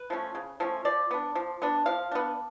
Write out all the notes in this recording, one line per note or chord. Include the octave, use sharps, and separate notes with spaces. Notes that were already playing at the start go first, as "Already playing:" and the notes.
Already playing: B4
F3 A3 C#4
C#3
F3 A3 C#4
F3 D5
B3 D4
F3
B3 D4
F3 F5
B3 D4